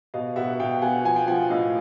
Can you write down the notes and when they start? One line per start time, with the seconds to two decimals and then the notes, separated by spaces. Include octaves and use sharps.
0.14 B2 D#5 F5
0.36 B2 E5 F#5
0.59 B2 F5 G5
0.82 B2 F#5 G#5
1.05 F3 F#5 G#5
1.16 F5 G5
1.27 F3 F#5 G#5
1.50 A2 D#5 F5